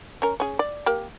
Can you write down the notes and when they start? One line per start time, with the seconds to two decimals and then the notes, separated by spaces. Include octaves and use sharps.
0.22 C#4 A#4
0.40 C#4 G#4
0.59 D5
0.86 A#3 G4